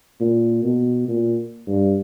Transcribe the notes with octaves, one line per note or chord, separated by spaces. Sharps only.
A#2
B2
A#2
G2